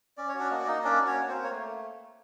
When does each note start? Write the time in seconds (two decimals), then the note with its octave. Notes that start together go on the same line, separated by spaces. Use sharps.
0.17 C#4 D5
0.28 C#5
0.34 F#4
0.39 D4 D5
0.51 A#3 D#5
0.60 D5
0.67 A#3 D#4 D#5
0.84 C#4 D4 D5
1.00 F#4
1.06 C#4 C#5
1.18 A#3
1.28 C4 C5
1.34 A#3
1.44 C#5
1.50 A3